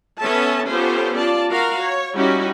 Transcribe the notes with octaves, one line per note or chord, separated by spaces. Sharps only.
B3 C#4 A4 E5 A5
B3 C#4 F4 G4 A4 C5
F4 D5 A5
F#4 A#4 F5 A#5
C#5
G3 C#4 D#4 E4 F#4 G4